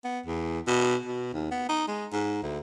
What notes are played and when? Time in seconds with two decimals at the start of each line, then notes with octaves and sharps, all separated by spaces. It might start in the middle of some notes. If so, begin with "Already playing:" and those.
0.05 B3
0.26 E2
0.67 B2
1.06 B2
1.33 D#2
1.51 B3
1.69 D#4
1.88 G#3
2.12 G#2
2.43 D2